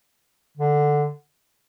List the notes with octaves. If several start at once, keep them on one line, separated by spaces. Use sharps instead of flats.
D3